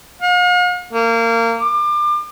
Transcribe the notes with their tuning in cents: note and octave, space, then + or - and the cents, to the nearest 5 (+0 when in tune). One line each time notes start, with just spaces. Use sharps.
F5 +45
A#3 -25
D6 +30